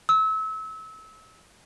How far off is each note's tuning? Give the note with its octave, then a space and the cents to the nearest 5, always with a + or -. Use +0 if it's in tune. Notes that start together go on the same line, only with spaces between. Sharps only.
E6 -30